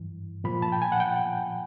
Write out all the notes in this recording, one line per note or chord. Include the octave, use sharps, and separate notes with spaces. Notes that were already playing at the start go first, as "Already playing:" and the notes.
Already playing: G2 E3
A#2 F3 B5
A5
G5
G#5
F#5
G5